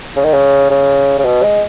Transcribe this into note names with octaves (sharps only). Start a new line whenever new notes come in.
C#3
D#3
C#3
C#3
C#3
B2
G#3